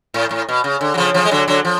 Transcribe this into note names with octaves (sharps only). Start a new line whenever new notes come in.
A2
A2
B2
C#3
D3
F#3
C#3 F3
C#3 F3
G#3
D3 F#3
D3 F#3
F3